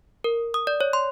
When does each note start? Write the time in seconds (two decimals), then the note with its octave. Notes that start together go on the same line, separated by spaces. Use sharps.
0.24 A#4
0.54 D#6
0.67 D5
0.81 C#5
0.93 C6